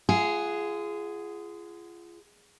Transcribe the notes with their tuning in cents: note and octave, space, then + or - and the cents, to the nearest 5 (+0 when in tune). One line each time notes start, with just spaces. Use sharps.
F4 -30 G#4 +0 F#5 +0